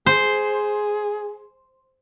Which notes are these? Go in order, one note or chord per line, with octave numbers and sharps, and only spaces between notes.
G#4 C5